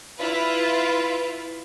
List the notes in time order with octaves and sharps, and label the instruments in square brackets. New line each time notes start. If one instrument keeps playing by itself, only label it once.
[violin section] E4 F4 B4